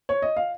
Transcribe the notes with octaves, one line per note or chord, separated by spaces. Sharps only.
C#5
D#5
F5